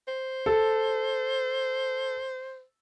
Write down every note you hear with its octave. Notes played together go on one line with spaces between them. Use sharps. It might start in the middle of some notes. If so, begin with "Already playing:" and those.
C5
A4